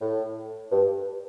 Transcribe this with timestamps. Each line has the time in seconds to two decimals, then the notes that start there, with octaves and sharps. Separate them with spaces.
0.02 A2
0.71 G2